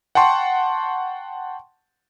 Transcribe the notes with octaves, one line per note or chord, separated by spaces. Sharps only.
F#5 G5 A5 C6 C#6